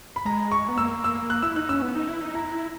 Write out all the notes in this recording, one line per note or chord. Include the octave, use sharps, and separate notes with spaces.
B5
G#3 A#5
C#6
B3
A#3 E6
E6
F#6
E4 E6
D#4 F#6
C#4 E6
B3
D#4
E4
D#4
E4 A#5
E4